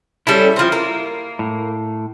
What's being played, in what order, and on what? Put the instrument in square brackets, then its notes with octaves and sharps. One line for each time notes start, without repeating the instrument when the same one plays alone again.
[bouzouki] G3 C#4 A4 [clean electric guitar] E4
[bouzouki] F3 C4
A#3
[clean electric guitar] A2